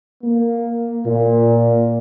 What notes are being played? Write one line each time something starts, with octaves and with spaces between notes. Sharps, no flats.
A#3
A#2